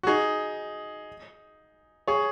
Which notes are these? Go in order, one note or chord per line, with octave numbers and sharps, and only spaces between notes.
F#4
D#4 G#4
G#4 C#5